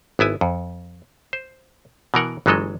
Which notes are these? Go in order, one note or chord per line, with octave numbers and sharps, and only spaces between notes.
G#1 B3 E4 G#5
F2
C5
B2 E3 A#4 F#5
G1 E3 F#3 G#3 A4 D#5